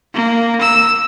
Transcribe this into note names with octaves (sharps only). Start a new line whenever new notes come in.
A#3
E6